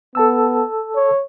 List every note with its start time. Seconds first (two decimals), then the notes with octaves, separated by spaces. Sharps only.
0.15 B3 A4 A5 E6
0.96 C#5